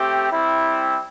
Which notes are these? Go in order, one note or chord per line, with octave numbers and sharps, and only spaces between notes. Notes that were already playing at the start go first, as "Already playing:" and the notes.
Already playing: A3 C4 G4
G3 C4 E4